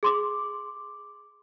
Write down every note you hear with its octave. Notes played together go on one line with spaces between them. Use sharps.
G#4 C6 D6